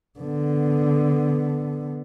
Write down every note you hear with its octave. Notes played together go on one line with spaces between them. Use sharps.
D3 B3